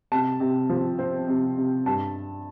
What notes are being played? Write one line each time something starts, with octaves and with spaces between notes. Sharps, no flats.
C3 A5
C3
F3
C4
C3
C3
G2 A5